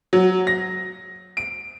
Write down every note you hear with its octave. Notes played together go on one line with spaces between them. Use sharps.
F#3
A#6
D7